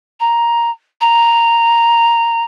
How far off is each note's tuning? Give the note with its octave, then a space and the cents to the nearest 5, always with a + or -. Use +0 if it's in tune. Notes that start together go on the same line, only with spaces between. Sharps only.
A#5 +5
A#5 -5